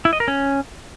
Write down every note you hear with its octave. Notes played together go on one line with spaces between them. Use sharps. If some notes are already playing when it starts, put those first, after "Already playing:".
E4
D#5
A#4
C#4